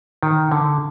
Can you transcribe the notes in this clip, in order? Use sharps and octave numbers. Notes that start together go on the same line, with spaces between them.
D#3
D3